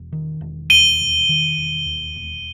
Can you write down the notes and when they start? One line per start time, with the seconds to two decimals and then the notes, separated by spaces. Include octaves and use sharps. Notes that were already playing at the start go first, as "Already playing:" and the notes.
Already playing: E1
0.12 D#3
0.41 E1
0.70 D#2 D#7 G7
1.00 E1
1.29 D#3
1.57 E1
1.86 D#2
2.15 E1